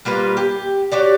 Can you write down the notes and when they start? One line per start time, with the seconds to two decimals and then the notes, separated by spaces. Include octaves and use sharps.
0.05 G3 A#3 F4 B4
0.37 G4
0.92 F#4 G4 C#5 D5